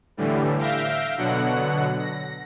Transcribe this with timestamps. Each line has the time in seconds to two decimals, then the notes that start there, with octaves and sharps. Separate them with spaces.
0.17 A2 D3 E3 G3
0.58 E5 F5 G6 A#6 D7
1.17 B2 D3 F#3 F#5
1.99 A#6